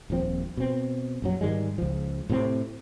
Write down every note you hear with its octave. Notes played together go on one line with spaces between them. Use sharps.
D#1 A#1 F3 C4
B2 C4
A#1 F#2 F#3
G#2 D#3 G3 G#3
C#2 F3
A2 C3 A#3 C4